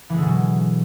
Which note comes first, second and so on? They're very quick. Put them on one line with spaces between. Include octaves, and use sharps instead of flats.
E3 G#3 D3 B2 F#3